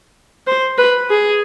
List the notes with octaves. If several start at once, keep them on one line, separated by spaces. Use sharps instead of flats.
C5
B4
G#4